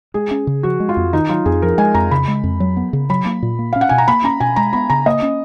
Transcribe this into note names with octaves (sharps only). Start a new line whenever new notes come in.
G#3 G#4
C#4
C#3
F3 F#4
G#3
F4
F2
D#3 D#4
F#3 F4
F2 G#4
F3 A#4
G#3 G#5
F2 A#5
C#3 B5
G#3
F2
F#3
B3
C#3
F#3 B5
A#3
A#2
A#3
C#4 F5
F#5
B2 G#5
A#5
A#3 B5
C#4 A#5
B2 G#5
G#3 A#5
B3 B5
C#3 A#5
A#3 D#5
C#4